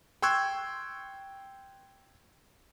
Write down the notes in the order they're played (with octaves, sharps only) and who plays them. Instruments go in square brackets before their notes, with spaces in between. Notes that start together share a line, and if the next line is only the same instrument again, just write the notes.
[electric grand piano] G5 C6 C#6 E6 F#6 G#6